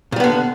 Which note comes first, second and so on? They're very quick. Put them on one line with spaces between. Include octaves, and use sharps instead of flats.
A#2 G3 B3 D3